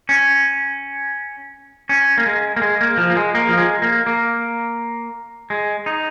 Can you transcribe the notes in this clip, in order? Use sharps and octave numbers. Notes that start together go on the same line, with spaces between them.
C#4
C#4
A#3
G#3
A#3
G#3
A#3
F3
A#3
G#3
A#3
F3
G#3
A#3
A#3
G#3
D#4